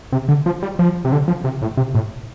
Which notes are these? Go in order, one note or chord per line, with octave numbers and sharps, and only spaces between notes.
C3
D3
F3
G3
F3
C3
D3
F3
C3
A2
C3
A2